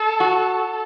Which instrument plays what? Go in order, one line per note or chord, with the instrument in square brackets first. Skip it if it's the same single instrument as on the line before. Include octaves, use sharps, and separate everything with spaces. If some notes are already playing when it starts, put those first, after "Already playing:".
Already playing: [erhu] A4
[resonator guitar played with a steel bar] F#4